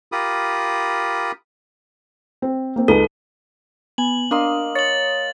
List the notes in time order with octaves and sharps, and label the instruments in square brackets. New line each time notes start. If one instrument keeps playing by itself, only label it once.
[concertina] F4 G4 A#4 B5 D#6
[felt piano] C4
A#3 C4
[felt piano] C#2 D#4 B4 [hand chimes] A4
[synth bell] B3 G#5 [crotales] F#7
[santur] A#3 D#5 C6 [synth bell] D4
[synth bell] C#5 [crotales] A6 F#7